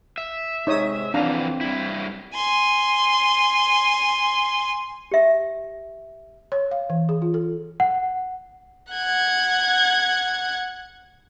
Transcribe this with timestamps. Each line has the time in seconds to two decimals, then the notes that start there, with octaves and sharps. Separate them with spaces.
0.18 E5
0.67 G#2 C3 G#3 D#4 C#5 D#6
1.14 F2 D3 E3 C4 D4 F5 A#5
1.61 G2 E4
2.34 G#5 C6
5.11 G4 E5
6.52 C#5
6.71 F5
6.90 E3
7.09 G#4
7.22 F4
7.34 A4
7.80 F#5
8.93 F#5 G#6